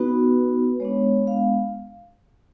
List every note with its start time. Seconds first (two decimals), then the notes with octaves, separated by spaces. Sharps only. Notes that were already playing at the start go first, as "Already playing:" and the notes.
Already playing: B3 D#4 F#4 B4
0.80 G#3 B3 D4 C#5
1.27 F5